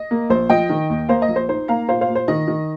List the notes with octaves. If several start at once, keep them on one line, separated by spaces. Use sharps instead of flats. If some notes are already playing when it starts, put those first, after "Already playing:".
Already playing: D#5
A#3
A#1 C5
F3 D#5 G5
D#3
D#2
A#3 C5 F5
D#5
A#1
C5
D#4 C5
A#3 F5 A#5
A#2 C5 F5
C5 F5
A#2
C5
D#3 D#5
D#3